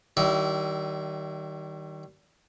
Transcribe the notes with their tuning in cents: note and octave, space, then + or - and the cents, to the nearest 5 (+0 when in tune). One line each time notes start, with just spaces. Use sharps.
D#3 +0 G3 -35 E4 +0